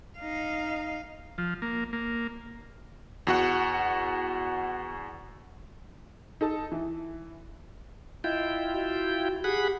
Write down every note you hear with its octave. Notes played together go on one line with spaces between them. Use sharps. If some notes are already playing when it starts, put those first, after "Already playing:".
D#4 F5
F3
A#3
A#3
E2 F#4 F#5
D#4 A4 A5
E3
E4 F4 D#5 G5
F#4
G4 G#4 F#5 B5